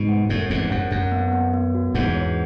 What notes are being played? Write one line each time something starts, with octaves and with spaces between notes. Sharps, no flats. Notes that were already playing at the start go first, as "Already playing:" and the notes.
Already playing: G#2 B2
F#5
F#2 A2 F#5
E2 G#2 F#5
F#2 F#5
F#2 F#5
B3
B3
B3
F#4
E2 G#2 F#5
C#5